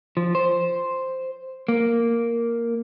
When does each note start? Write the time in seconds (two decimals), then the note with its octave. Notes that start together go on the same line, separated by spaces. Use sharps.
0.17 F3
0.35 C5
1.68 A#3